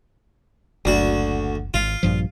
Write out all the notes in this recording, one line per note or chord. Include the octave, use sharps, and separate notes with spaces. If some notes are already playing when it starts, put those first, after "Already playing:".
F#1 D2 F#4
G#1 F4
A#1 G2 F3